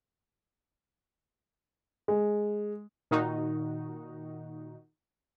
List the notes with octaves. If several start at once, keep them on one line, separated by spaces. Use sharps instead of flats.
G#3
A#2 D#3 D#4 F#4